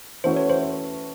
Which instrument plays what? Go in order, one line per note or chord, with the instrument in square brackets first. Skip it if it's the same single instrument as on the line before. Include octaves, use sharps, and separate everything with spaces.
[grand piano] E3 A3 C#4 F#4 B4 [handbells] C5
[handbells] C#5
C5